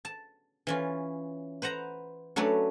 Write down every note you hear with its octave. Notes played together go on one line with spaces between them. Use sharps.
A5
E3 C#4 F4
B4 C5 F#5 A#5
F#3 A3 C#4 D4 B4 C#5